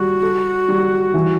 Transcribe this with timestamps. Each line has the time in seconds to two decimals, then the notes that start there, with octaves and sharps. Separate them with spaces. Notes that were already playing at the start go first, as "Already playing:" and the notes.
Already playing: G3 F#4
0.22 A4
0.68 G3
1.14 E3